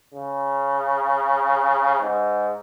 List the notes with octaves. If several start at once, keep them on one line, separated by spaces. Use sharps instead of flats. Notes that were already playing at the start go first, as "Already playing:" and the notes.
C#3
G#2